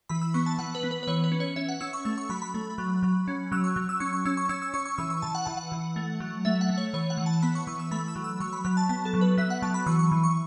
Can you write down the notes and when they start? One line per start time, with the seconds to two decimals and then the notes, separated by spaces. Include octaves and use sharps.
0.09 E3 B5
0.22 E6
0.34 B3 C#6
0.46 A5
0.58 E3 F#5
0.75 B4
0.83 B3
0.91 B4
1.03 B4
1.07 E3 C#5
1.24 B4
1.32 C#4
1.40 C#5
1.56 C#4 E5
1.69 F#5
1.81 C#4 E6
1.93 C#6
2.05 A3 E6
2.18 C#6
2.30 F#3 B5
2.42 B5
2.54 A3
2.78 F#3
3.03 F#3
3.28 C#4
3.52 F#3 E6
3.64 C#6
3.76 F#3
3.89 E6
4.00 C#4 C#6
4.13 C#6
4.25 C#4 E6
4.37 C#6
4.49 C#4 E6
4.62 E6
4.74 C#4 C#6
4.85 C#6
4.98 E3 E6
5.10 C#6
5.22 E3 A5
5.35 F#5
5.46 E3 A5
5.57 F#5
5.72 E3
5.96 A3
6.20 F#3
6.45 A3 E5
6.61 F#5
6.69 A3
6.78 C#5
6.93 E3 C#5
7.10 F#5
7.18 E3
7.26 A5
7.42 B3 B5
7.55 C#6
7.67 E3 C#6
7.79 E6
7.91 A3 B5
8.08 E6
8.16 F#3
8.24 E6
8.40 F#3 C#6
8.53 B5
8.65 F#3 B5
8.77 A5
8.89 B3 A5
9.05 A4
9.14 F#3
9.21 B4
9.38 B3 E5
9.50 F#5
9.62 F#3 A5
9.74 B5
9.86 E3 C#6
9.99 C#6
10.12 E3
10.24 C#6